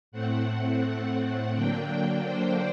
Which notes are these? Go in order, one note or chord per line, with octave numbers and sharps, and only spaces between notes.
A2 A3 C4 F#5
D3 F#3 A#3 D4 G5
C5